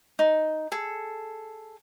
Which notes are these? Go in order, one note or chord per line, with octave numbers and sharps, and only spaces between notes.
D#4
G#4 A4